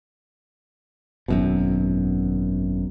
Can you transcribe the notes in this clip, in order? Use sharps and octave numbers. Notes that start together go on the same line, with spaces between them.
G#1 F#2 B2